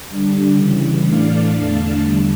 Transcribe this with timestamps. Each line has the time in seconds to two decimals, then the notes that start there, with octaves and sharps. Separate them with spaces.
0.09 D3 G3 D4
0.57 C#3 E3 G3
1.04 A2 E3 A3 D4 D5 F5
1.52 E2 D3 A3 D4 F5 A5
2.00 E2 D3 G3